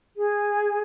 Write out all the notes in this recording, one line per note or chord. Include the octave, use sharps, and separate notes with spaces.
G#4